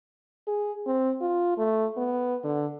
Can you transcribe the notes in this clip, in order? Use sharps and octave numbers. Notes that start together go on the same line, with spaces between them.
G#4
C4
F4
A3
B3
D3